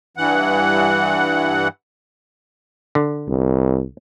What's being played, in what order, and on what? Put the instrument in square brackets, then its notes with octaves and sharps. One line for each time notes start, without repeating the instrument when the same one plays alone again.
[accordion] G2 E3 F#5
[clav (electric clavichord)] D3
[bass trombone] C2